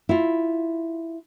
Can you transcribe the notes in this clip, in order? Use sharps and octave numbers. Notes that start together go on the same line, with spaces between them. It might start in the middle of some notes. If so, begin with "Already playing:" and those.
E4 F4